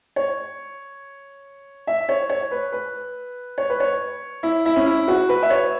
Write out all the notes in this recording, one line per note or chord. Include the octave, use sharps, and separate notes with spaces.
C#5
E5
C#5
C#5
B4
B4
C#5
B4
C#5
E4
E4
C#4
E4
F#4
B4
E5
C#5